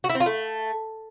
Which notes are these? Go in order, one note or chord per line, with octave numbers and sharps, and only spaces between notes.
F#4
E4
C4
F4
A3